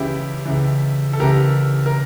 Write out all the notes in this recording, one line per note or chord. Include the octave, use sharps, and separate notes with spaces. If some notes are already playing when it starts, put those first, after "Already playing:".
Already playing: C#2 C#3 E3 E4 G4
C#2 C#3 E3
A4
C#2 C#3 E3 G4 A#4
A#4